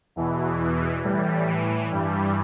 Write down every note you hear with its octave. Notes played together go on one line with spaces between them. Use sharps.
E2 B2 E3
A2 E3 G3
E3
G2 E3 G3